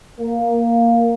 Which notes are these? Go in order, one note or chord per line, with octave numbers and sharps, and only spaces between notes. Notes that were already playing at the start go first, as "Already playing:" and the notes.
A#3